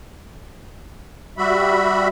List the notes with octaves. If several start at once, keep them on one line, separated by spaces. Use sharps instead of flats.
G3 F#4 E5 B5